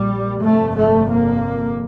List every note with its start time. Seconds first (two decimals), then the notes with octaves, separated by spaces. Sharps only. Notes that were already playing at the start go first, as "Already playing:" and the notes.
Already playing: A#1 A#2 G3
0.41 G1 F2 C3 A3
0.75 A3
1.09 A#3